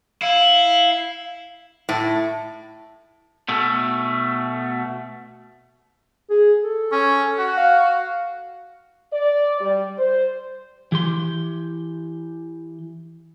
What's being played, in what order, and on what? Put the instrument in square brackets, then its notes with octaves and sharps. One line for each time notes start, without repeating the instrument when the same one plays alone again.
[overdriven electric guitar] E4 [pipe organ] F5
[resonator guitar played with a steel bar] A2
[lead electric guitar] B2 A3
[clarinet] G#4
A4
[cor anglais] C#4
F#4
[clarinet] F5
[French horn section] D5
G3
C5
[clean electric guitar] E3 G4 C6